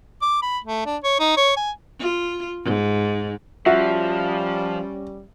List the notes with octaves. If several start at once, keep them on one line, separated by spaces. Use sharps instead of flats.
D6
B5
A3
D4
C#5
D#4
C#5
G#5
F4
G#2
F3 G3 C#4 F#4 E5